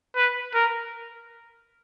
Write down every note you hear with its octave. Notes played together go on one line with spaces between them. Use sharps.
B4
A#4